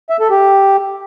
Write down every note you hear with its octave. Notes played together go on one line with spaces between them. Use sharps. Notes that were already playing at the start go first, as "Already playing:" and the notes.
E5
A4
G4